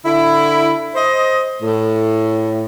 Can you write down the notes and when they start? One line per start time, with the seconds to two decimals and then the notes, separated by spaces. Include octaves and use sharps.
0.04 D3 E4
0.95 C5 D#5
1.63 A2